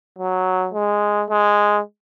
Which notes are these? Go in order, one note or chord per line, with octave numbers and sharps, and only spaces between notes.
F#3
G#3
G#3